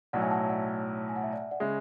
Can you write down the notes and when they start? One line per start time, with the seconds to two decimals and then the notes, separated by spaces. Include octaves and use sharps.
0.13 B1 A2 F#3 D5 F#5
0.22 E5 G#5
0.31 F#5 A5
0.49 D5 F#5
1.09 G#5
1.16 F#5
1.23 E5
1.32 D5
1.42 E5
1.51 D5 F#5
1.60 C#3 G#3 E5